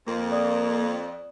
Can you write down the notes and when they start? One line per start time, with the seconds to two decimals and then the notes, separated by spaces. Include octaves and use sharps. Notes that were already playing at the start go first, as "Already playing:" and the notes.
0.07 F2 A#3
0.32 D5 D#6